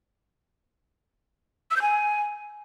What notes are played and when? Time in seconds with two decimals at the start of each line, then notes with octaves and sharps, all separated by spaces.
1.71 E6
1.76 G6
1.82 G#5